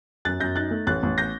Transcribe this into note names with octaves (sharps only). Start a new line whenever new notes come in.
F#2 F#6 A6
F#2 G6 A#6
D#4 F#6 A6
A3
A1 F#6 A6
A1
G6 A#6